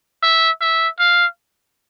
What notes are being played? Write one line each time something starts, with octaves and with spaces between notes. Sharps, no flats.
E5
E5
F5